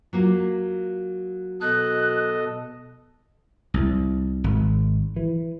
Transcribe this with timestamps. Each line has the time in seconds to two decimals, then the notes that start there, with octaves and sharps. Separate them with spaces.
0.13 F#3 A#3 F4
1.61 B2 A4 D#5 F#6
3.74 C2
4.44 G#1
5.16 E3